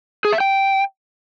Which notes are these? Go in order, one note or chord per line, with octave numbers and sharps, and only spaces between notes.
G#4
E5
G5